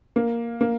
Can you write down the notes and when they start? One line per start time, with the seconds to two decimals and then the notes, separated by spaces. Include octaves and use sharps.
0.16 A#3
0.61 A#3